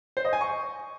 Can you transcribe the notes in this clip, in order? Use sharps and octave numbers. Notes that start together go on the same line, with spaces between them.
C5
D#5
G#5
C#6